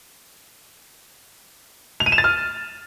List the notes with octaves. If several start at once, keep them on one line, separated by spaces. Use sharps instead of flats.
F7
D#7
E7
A6
F6